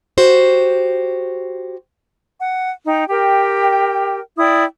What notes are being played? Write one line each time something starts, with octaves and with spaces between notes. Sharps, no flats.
F#4 G4 C5
F#5
D#4 G5
G4 A#4 G5
E4 D5 G5 D#6